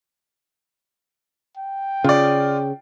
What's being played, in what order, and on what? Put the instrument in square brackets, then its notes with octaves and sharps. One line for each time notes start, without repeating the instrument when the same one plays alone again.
[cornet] G5
[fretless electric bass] C#3 [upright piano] F4 D5